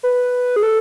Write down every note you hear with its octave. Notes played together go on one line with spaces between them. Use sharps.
B4
G#4
A4